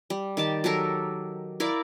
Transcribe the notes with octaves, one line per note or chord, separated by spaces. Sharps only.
G3
D#3 G4 A5
F#3 G4 A4 A#4
E4 A#4 D5 F5